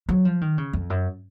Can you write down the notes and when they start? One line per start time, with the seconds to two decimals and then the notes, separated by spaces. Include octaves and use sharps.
0.09 F#3
0.25 F3
0.41 D#3
0.58 C#3
0.73 F2
0.90 F#2